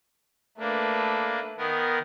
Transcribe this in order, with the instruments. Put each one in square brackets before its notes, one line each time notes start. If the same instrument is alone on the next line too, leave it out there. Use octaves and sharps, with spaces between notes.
[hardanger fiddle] A3 B4 [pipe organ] A#3 D4
[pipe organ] D#3 B3 A#4